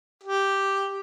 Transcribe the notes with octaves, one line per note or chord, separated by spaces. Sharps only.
G4